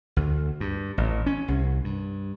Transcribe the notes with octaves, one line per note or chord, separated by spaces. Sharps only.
D2
G2
A1
C#4
C2
G2